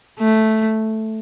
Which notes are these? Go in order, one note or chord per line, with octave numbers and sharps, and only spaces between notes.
A3